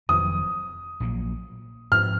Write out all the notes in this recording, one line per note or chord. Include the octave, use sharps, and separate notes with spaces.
F1 F2 D#3 F#3 D#6
A#1 A#2 F#3 A#3
G#2 F3 C4 F6